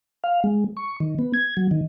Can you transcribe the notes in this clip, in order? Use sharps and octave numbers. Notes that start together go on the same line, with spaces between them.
F5
G#3
C#6
D#3
B3
G#6
F#3
D#3